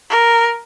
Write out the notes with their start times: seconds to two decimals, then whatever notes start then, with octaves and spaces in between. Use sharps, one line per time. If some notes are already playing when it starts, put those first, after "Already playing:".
0.10 A#4